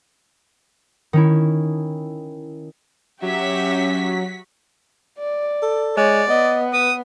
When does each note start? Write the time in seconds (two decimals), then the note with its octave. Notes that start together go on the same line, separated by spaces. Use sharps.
1.13 D#3 C#4 E4
3.22 F#3 C#4 F#4 G4 E5 F#5 B6
5.19 D5
5.62 A4
5.97 G#3 C#5 D5
6.30 B3 D#5
6.73 B4 D#6